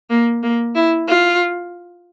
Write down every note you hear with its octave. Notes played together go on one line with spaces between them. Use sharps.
A#3
A#3
E4
F4